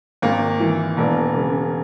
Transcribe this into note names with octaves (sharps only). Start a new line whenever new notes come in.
G#1 A#3
E3
E1 A#3
C#3